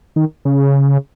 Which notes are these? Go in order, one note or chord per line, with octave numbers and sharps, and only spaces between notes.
D#3
C#3